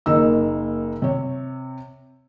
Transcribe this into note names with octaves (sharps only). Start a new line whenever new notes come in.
F#1 A#3 D#4 E6
C3 C#5